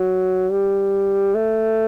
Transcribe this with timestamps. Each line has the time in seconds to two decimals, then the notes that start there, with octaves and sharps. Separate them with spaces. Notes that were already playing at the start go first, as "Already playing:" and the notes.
Already playing: F#3
0.51 G3
1.35 A3